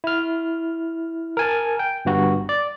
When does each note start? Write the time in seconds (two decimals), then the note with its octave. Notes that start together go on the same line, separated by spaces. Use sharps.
0.04 E4 F6
1.37 A#4 G#5 A5
1.79 G5
2.05 G1 G2 F#4
2.49 D5